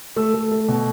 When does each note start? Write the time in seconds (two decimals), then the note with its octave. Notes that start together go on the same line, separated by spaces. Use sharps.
0.16 A3 E6
0.34 A3
0.52 A3
0.68 B2